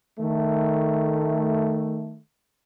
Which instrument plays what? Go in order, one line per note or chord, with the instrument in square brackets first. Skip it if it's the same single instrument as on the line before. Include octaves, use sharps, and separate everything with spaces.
[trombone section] D#3 A3